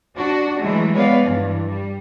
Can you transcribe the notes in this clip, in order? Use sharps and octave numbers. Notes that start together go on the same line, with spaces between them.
D4 F#4
E3 F#3 G#3 A3
G#3 B3 B4 C#5 D5 F5
G2 E3
G3